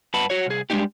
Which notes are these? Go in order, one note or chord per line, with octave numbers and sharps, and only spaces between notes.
G2 B4 F#5 A5 B5
F#4 C#5
C2 G#4
G3 G#3 A#3 D4 D#4 G4